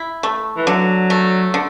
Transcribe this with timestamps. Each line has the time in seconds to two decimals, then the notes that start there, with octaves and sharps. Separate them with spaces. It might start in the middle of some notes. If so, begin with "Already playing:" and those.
Already playing: E4
0.23 A3
0.57 E3
0.67 D3 F#3
1.10 A3
1.54 D3